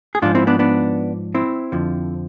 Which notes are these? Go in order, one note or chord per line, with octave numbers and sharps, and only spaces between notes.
G#4
G#2 F3 D4 F4
C4 E4
B3 D4
B3 D4
C4 E4
F2 D3 F3